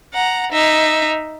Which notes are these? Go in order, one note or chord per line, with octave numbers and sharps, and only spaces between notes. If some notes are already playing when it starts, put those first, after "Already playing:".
F#5 A#5
D#4 E5